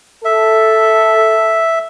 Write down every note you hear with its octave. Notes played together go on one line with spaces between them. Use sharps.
A4 E5